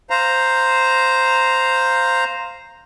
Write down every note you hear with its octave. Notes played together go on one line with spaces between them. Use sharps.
C5 F5 A#5